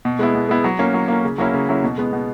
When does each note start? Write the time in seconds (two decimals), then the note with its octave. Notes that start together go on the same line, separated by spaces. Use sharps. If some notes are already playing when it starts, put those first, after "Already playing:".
0.05 B2
0.19 G#3 B3 E4
0.35 B2
0.49 G#3 B3 E4
0.64 F#3
0.79 A#3 C#4
0.94 F#3
1.08 A#3 C#4
1.24 C#3
1.38 F#3 A#3 C#4 E4
1.54 C#3
1.69 F#3 A#3 C#4 E4
1.83 B2
1.98 G#3 B3
2.13 B2